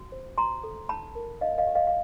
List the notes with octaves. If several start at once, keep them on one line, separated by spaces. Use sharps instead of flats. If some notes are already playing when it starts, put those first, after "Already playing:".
Already playing: F#4
C5
F#4 A#5 C6
A4
D#4 A5 B5
A#4
D#4 D#5 F5
D#5 F5
G4
D#5 F5
F5